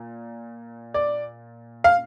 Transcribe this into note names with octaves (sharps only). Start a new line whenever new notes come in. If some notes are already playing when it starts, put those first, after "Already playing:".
Already playing: A#2
D5
F5